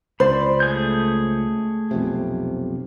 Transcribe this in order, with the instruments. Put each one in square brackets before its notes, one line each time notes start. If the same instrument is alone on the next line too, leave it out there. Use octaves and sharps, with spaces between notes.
[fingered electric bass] C#2 [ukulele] C5 [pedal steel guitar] D5 B5
[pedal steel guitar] A3 G#4 G6
[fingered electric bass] B1 F2 C3